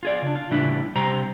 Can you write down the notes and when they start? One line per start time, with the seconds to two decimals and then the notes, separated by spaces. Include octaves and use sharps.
0.03 F4 G#4 D5
0.22 C#3 D4
0.36 F4
0.51 A2 C#3 E3 G3 D4 E4
0.95 C3 G3 G4 C5 A#5